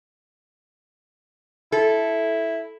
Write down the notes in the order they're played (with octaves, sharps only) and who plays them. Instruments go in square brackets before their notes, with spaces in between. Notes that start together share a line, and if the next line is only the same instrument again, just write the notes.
[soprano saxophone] E4 [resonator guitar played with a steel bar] A4